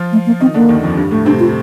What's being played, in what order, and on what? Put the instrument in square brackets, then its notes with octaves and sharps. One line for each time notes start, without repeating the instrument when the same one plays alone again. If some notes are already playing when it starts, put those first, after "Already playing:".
Already playing: [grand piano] F3 F4
[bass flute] A3
A#3
[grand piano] D#3 D#4 [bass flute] C4
[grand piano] D3 D4 [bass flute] A#3
[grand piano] D#2 D#3
F2 F3
G2 G3
A2 A3
[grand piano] C3 C4 [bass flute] D4
[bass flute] F4